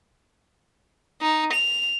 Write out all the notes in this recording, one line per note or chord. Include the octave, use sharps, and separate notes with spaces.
D#4
F7